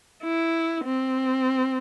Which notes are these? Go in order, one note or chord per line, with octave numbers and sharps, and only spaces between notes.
E4
C4